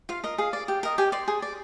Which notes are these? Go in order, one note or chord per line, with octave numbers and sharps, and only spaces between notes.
F4 F5
A#4 D#5
G#4 F5
D5
G4
A#4 D#5
G4 G#5
D5 C6
G#4
D5